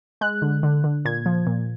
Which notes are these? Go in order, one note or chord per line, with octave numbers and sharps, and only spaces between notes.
G#3 F#6
D3
D3
D3
A#2 G#6
F3
A#2